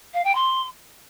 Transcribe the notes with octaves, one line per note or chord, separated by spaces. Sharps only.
F5
G5
C6